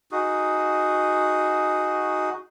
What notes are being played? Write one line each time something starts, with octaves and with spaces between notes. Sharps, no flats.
D#4 F#4 G#4